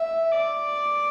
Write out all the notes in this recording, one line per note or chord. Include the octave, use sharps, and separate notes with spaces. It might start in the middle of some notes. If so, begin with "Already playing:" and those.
Already playing: E5
D5